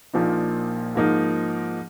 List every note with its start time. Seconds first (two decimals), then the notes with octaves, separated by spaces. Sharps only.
0.13 A#1 A#2 F3 A#3 D#4
0.95 G#2 F3 A#3 D#4